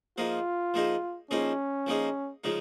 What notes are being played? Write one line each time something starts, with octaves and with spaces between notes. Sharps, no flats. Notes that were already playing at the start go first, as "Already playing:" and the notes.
F3 A#3 D#4 F4 G#4 C5
F3 A#3 D#4 G#4 C5
F3 A#3 C#4 D#4 G#4 C5
F3 A#3 D#4 G#4 C5
C#3 F3 G#3 D#4